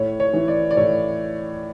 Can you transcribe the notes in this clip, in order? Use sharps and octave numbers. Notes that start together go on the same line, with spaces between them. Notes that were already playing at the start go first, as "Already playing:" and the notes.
Already playing: A2 C#5
C#5
E3
D5
D5
A2 C#5